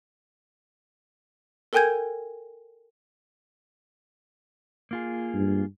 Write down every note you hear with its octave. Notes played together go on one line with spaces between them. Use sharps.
A4 A#4 G5 G#5 G6 G#6
A#3 F4 G#4
G2